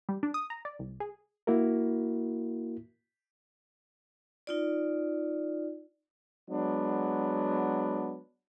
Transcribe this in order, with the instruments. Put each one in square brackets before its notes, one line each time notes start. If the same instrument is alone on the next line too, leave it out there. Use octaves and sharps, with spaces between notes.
[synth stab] G3
D4
D#6
A#5
D5
C2
G#4
[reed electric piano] A#3 E4 F#4 A#4
[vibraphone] D#4 F4 D5
[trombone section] F#3 G#3 B3 D4